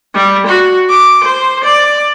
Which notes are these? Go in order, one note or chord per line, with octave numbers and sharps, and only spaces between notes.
G3
F#4
D6
C5
D5